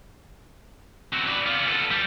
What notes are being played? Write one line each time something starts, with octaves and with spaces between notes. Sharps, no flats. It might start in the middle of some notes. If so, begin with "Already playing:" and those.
C4 F#4
B4 D5
B3 F4
A4 B4
G3